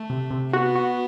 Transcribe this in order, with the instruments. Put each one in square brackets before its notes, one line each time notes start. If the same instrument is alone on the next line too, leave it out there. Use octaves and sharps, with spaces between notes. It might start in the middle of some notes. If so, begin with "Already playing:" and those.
Already playing: [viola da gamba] A3
[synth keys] C3
C3
[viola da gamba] B3 [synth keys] F#4
[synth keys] F#4